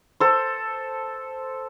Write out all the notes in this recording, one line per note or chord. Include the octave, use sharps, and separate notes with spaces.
A4 C5